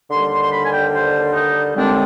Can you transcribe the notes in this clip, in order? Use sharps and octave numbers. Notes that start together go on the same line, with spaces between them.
D#2 D3 G3 C6
C6
C6
B5
G#5
G5
C5
D#4
D#2 D3 G#3 C4 D4